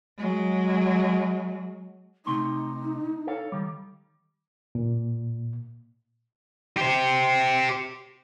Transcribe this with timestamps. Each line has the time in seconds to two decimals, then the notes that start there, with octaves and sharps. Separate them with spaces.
0.18 F#3 G#3
2.26 C3 A3 D#4 C6
3.27 A4 C#5 F5
3.52 D#3 G3
4.75 A#2
6.77 G4 C5